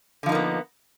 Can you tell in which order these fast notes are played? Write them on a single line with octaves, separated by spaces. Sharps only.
D3 F3 D#4 A#3 B3